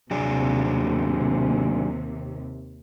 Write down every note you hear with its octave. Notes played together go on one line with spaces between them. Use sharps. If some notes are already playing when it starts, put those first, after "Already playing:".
D#2 C3 F#3 D4 G#4